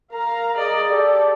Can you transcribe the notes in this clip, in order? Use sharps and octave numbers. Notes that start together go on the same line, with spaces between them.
A#4 F5 A#5
G#4 D5 D#5
G4 A4 D5